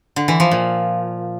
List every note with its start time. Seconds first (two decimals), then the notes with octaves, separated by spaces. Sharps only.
0.16 D3
0.28 E3
0.40 F3
0.51 A#2